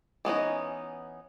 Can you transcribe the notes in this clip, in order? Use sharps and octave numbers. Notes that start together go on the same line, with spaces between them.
E3 B3 C#4 D#4